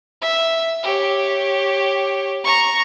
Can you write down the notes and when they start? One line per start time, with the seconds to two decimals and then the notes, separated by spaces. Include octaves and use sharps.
0.22 E5
0.83 G4 C#5
2.44 A#5 C#6